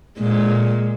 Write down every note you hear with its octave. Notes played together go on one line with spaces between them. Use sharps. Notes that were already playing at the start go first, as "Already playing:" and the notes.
A#2 G#3